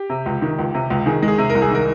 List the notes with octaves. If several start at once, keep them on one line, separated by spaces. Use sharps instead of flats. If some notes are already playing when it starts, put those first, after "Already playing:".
Already playing: G4
C3
C#2
D#3
C#2
C3
C#2
D#3 G#4
G#3
G#4
C3
A#4
C2
G#4
D#3 A#4